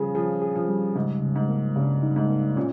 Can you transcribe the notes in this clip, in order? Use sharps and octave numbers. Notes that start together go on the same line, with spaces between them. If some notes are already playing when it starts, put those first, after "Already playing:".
Already playing: C#3 F3 G3 C#4 G#4
F3 G#4
G#4
F3
G3
G#2 C#3
C#3
G#2
A#3
G2 C#3
D#4
G#2
A#3
A#2 C#4